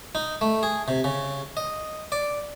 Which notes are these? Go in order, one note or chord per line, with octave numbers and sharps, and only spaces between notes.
D#4
A3
G#4
C3
C#3
D#5
D5